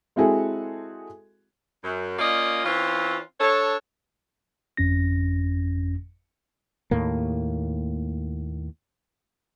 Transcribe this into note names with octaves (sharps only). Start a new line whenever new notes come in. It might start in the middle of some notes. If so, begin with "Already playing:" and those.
G#3 C4 E4 F#4 G#4 A4
F#2
A#3 C#4 F4 D5 D#5
E3 C4 C#4 F4
D4 A4 C#5
G1 F2 C#4 A#6
D#2 A2 A#3